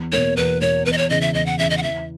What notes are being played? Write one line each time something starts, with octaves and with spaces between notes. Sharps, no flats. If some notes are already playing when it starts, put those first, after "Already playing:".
Already playing: E2
B2 A#3 C#5
E2 B4
B2 A#3 C#5
E2 B4
D#5
C#5
C#3 E3 D#5
E5
E2 D#5
F#5
C#3 E3 E5
D#5
F#5
E3 E5